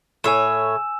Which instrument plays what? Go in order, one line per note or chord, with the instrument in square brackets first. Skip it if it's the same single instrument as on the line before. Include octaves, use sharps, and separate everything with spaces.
[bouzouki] A2 C#5 [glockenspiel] G#5 E6 E7